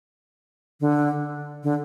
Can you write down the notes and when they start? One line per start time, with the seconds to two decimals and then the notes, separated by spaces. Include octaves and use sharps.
0.81 D3
1.63 D3